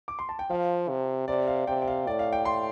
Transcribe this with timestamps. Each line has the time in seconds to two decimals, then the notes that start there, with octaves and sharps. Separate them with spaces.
0.08 D6
0.19 C6
0.29 A5
0.39 G5
0.50 F3 F5
0.89 C3
1.28 C3 D5
1.47 F5
1.67 C3 G5
1.82 G5
1.88 F5
2.07 A2 D5
2.19 F5
2.33 G5
2.45 C6